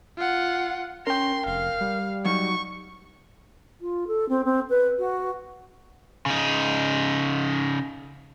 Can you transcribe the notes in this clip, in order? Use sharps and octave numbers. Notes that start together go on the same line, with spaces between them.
F4 F#5
C#4 A#4 G5 C6
F1 F5
G3
F#3 D#4 F#4 C#6
F4
A4
C4
C4
B4
F#4
C#3 D#4